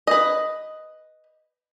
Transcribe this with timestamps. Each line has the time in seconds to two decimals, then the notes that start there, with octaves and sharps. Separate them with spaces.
0.07 B4 D#5